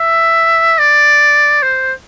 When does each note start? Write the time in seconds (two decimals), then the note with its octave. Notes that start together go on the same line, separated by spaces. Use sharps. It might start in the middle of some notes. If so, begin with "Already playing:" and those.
Already playing: E5
0.78 D5
1.62 C5